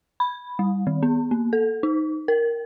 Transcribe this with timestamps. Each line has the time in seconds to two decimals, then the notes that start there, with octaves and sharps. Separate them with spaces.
0.20 B5
0.59 G3
0.87 D#3
1.03 B3
1.31 A#3
1.53 A4
1.83 D#4
2.28 A#4